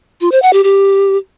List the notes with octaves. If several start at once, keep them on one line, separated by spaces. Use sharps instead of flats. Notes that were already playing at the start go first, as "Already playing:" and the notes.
F4
C5
F#5
G4
G4